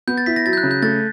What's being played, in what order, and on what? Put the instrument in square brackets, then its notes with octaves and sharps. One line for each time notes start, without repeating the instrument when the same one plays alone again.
[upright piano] B3 [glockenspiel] G6
[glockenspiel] A6
[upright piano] E4 [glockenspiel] B6
[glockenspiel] A#6
[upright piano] F#3 [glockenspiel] A6
[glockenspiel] G6
F#6
[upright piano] C#3
[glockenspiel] G6
[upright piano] A3 [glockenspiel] A6